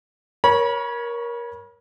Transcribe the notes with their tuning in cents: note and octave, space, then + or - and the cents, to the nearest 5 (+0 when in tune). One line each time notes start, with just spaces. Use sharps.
A#4 +20 C#5 +0 B5 -35